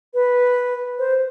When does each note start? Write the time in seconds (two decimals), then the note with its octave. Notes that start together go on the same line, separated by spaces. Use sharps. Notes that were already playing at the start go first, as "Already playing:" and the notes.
0.14 B4
0.99 C5